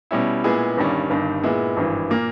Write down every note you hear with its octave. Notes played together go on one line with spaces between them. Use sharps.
B2 G3 C#4 E4
A#2 G#3 B3 E4 G#4
G1 G2 D#3 G3 C#4
G1 G2 D#3
A#2 G#3 B3 E4
G#1 G2 E3
A#2 A#3